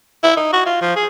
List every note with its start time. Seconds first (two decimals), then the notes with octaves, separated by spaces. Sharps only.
0.23 E4
0.37 D#4
0.53 F#4
0.66 F4
0.81 F3
0.96 G#4